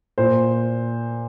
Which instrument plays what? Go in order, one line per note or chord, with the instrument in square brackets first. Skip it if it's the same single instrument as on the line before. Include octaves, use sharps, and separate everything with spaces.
[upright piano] A#2 C5